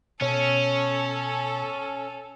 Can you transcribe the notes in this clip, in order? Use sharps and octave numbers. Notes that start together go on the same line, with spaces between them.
B2 C#4 A4 C#5